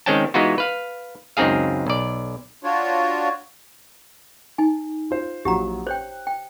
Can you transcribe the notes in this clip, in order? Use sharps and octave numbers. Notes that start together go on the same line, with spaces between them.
D#3 G#3 C4 C#4 G5 A5
E3 G#3 B3 D#4 F4 F#4
B4 F5
C#2 F#2 C4 D#4 G#4 F5
B1 D5
D4 F4 F#4 C#5
D#4 G#5
F4 C5
A#1 F#3 G4 F#5 A#5
C5 C#5 G5 F#6
G5